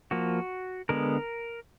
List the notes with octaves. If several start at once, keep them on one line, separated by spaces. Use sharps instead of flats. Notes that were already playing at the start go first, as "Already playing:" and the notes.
F3 A#3 F#4
D3 G#3 B3 A#4